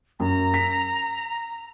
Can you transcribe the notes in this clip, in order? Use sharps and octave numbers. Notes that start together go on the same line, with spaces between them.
F#2 A#5
B6